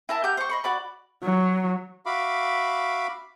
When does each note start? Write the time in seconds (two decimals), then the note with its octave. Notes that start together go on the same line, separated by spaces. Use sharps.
0.09 E4 A#4 A5
0.24 G4 F#5 G6
0.37 C5 C#6
0.50 D#5 B5 C#6
0.64 F#4 D5 B5
1.23 F#3
2.06 F#4 E5 F5 B5 D6